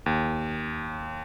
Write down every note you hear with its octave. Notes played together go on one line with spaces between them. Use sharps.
D#2